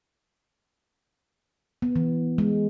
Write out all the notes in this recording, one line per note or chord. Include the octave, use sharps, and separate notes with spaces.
B3
E3
G#3